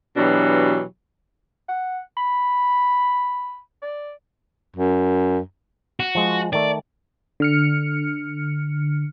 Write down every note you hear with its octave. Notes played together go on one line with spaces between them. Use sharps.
B2 E3 F#3 D4 G4
F#5
B5
D5
F#2
F#4
F3 G#3
D#3 A3 D5
D3 F6 C#7